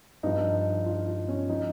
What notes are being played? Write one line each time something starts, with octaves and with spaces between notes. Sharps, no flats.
G2 F3 D#4
F4
F4
C#4
F3 D#4